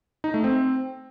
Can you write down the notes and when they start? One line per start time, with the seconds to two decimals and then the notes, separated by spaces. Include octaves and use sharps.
0.24 D#4
0.34 A3
0.44 C4